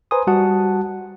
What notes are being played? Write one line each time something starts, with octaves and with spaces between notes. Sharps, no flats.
B4 C5 G#5 A#5 C6 D#6
G3 F#4 F#5 A5